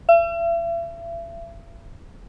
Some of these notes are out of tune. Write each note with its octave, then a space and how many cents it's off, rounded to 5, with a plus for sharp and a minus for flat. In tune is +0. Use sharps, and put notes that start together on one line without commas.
E5 +40